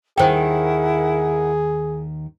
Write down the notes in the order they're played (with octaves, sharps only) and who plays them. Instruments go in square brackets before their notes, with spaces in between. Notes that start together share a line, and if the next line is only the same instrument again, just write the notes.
[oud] D#2 D#3 [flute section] E4 A#4 F#5 [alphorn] G#4 [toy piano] C5 G5